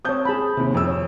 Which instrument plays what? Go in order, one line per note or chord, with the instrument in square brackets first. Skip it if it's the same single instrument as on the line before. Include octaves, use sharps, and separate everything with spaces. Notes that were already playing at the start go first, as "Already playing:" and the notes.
[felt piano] C4 G6 [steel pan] C#5 A5 D#6
[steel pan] G#4 A5 B5
[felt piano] D#2 C3
F2 E6
[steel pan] C#5